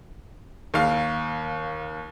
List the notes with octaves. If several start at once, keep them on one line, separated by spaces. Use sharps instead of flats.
D#2 F5